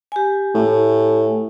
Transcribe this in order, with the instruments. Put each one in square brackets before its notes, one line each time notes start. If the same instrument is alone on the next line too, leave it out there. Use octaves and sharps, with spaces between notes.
[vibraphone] G4 G#5
[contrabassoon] A2